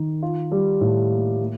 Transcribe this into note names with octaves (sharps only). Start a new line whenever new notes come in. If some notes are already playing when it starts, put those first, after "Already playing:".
Already playing: D#3
F4
G3
A2
A#3
A#3